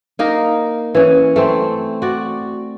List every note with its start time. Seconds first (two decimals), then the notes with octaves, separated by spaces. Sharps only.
0.19 A#3 D#4 A#4
0.95 E3 C#4
1.36 A3 C4
2.02 F#4 D5